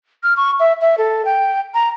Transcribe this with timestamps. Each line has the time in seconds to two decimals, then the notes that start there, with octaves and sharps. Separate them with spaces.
0.23 F6
0.37 C#6
0.60 E5
0.81 E5
0.98 A4
1.25 G5
1.74 A#5